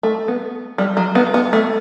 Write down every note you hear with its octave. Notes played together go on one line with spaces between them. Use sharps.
A3
B3
G3
F#3
B3
B3
A3